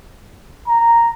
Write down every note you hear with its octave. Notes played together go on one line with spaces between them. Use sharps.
A#5